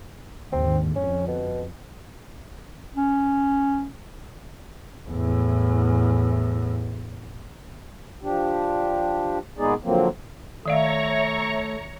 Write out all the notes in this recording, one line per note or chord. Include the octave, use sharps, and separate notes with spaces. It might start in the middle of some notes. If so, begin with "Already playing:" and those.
D#2 G#2 D3 C4
F2 C#4
B2
C#4
E2 A2
F3 D4 G4
A#2 G#3 B3 D#4 G#4 D5
D3 F3 F#3 A#3 C4
D#3 A3 C#5 D5 E5 F5 A#5 C#6